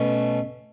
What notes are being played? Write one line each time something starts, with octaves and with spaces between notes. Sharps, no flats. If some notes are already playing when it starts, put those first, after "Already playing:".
Already playing: B2 A3 C#4